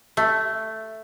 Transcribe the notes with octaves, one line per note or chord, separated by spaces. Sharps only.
A3